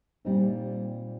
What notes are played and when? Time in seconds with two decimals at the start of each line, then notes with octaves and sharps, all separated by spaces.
0.25 A#2 G3 C4 D#4